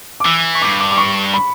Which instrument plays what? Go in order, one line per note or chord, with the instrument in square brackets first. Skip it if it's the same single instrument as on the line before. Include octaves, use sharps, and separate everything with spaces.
[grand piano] D6
[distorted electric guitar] E3 [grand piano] E6
[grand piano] C#6
[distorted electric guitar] G2 [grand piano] D6
[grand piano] D6
D6
C#6
B5